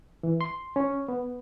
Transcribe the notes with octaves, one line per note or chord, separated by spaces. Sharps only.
E3
C6
C#4
B3